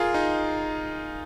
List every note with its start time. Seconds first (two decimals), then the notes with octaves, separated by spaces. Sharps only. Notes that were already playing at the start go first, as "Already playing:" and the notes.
Already playing: F4 G#4 A#4
0.14 D#4